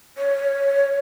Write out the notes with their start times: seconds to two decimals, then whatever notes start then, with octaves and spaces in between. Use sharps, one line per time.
0.18 C#5